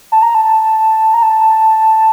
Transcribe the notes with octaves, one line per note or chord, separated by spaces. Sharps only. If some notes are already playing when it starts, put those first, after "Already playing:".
A5
A#5
A5
A#5
A5